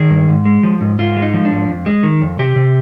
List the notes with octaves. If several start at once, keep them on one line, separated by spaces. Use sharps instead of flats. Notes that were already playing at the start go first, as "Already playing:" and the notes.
Already playing: D#3 G#4
G2
G#2
G#3
F3
G#2
G#2 F4
G#3
D#4
F3
D4
G#2
F2
G#3
D#3
F2
C3 G4
C3